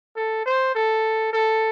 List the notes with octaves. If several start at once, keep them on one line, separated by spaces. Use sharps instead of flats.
A4
C5
A4
A4